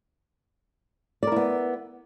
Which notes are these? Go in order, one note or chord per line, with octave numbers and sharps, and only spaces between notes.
B3 E4 A#4 D5